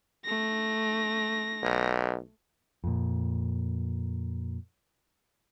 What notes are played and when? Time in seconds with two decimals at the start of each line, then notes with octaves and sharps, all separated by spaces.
0.25 A3 A#6
1.63 B1
2.84 F2 A#2